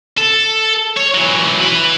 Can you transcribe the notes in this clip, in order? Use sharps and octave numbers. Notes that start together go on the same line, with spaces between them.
A4
C#5
E3 F#3
E4 B4